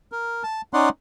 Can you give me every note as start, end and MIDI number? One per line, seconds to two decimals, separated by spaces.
0.12 0.43 70
0.43 0.61 81
0.73 0.89 61
0.73 0.89 63
0.73 0.89 74
0.73 0.89 78
0.73 0.89 84